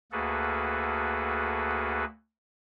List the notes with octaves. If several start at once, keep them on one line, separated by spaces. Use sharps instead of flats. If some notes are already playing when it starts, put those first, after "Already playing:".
D2 A#3 F#4 G#4 A4 B4